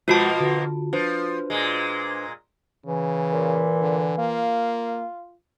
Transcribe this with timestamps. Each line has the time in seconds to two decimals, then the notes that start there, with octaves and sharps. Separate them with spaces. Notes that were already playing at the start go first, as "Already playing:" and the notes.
0.08 B2 F3 G#3 A#3 F4 F#4 A5
0.40 D3
0.93 F3 D4 B4 C5
1.50 A#2 G#3
2.86 C#3 E3
3.32 A#2
3.81 D3
4.18 A#3 F4